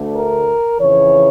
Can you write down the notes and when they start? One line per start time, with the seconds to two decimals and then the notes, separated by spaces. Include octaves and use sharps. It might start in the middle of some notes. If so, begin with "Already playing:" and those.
Already playing: D2 D3 A3
0.15 A#4
0.80 F2 C#3 E3 C#5